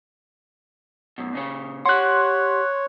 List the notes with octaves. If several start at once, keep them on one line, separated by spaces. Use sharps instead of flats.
F#2 B2
A#2 C#3 C#5
G4 C#5 F#5 C6 F#6